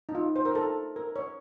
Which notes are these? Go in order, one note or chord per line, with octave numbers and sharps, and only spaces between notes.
D#4
F4
C5
A#4
A4
A#4
C#5